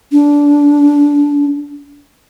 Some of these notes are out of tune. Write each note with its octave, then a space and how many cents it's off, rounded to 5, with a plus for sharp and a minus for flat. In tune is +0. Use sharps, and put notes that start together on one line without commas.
D4 -20